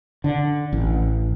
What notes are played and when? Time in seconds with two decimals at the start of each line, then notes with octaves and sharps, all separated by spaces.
0.24 D3
0.73 A1